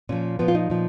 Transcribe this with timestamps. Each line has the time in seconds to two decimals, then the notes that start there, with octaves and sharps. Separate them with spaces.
0.09 A#2 F3 C#4
0.39 A#2 F3 B3
0.48 F4
0.55 D#4
0.70 A#2 F3